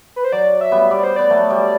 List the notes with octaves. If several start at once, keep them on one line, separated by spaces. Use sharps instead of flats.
B4
C5
F#3 D5
E5
G3 B3
G3 B3 D5
C5
B3 D5
F#3 A3
G3